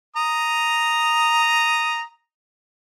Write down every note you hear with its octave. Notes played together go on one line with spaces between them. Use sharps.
A#5 D#6